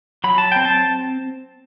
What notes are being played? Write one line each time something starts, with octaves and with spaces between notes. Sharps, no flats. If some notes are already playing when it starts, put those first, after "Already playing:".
F#3 B5
A5
C4 G5
A5